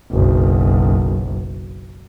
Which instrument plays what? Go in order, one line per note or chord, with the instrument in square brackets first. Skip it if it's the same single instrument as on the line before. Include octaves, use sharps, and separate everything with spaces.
[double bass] F#1 B1